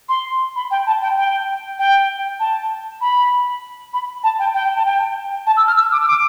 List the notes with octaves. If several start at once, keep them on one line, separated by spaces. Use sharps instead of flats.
C6
B5
G5
A5
G5
G5
G5
A5
B5
B5
A5
G5
G5
A5
G5
A5
E6
F6
E6
D6
E6
D6